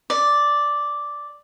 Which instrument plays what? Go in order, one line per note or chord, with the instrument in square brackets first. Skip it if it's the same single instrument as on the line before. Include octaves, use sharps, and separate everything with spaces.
[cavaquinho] D5